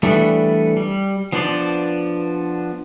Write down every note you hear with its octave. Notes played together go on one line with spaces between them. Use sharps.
E3 G3 A3 B3 D4
G3
F3 B3 D4 C5 D5